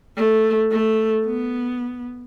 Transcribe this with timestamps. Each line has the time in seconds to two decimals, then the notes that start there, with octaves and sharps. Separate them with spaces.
0.17 A3
0.71 A3
1.26 B3